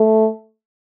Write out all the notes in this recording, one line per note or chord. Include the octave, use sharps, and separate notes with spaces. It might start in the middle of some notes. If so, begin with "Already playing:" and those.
Already playing: A3